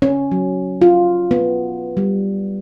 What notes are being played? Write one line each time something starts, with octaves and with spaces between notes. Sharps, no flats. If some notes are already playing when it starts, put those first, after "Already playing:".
C#4
F#3
F4
B3
G3